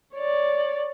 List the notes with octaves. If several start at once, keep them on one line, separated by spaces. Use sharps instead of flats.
C#5 D5